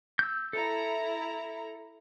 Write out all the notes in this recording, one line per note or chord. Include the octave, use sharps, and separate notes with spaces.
E6 G6
E4 A4 A#5